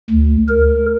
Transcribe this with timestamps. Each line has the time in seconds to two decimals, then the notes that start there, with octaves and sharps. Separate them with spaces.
0.10 D2
0.49 A#4